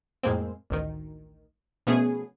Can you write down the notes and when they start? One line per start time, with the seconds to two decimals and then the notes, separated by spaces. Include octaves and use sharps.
0.23 F2 A2 G#3 A#3 C4
0.70 A1 D2 D#3
1.87 B2 F3 A3 B3 C#4 G#4